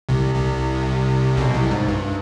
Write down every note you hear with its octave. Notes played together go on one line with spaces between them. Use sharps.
C2 C3
C2 C3
B1 B2
C2 C3
G#2
G2